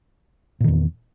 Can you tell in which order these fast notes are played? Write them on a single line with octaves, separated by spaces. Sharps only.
A#2 D#3 E2